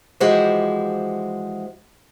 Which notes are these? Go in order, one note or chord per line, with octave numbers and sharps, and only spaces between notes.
E3 F3 G#3 F#4 G4 C5